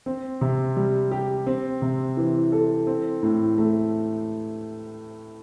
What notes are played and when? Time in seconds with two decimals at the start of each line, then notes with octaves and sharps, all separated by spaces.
0.06 C4
0.41 C3
0.76 G3
1.11 G4
1.47 C4
1.82 C3
2.17 E3
2.52 A4
2.87 C4
3.23 A2
3.58 A3